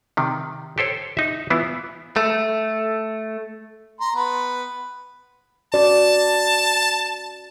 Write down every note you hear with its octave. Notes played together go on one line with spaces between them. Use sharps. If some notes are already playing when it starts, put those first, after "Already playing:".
C3 D#3
G4 A4 C5 C#5
D#4 E5
E3 B3 E4 F4
A3
A#5 C6
B3 B4
C#4 F#4 D5 A5